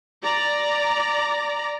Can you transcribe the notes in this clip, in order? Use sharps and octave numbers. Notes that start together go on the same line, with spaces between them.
D5 A#5